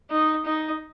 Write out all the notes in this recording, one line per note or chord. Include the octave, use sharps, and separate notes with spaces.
D#4
D#4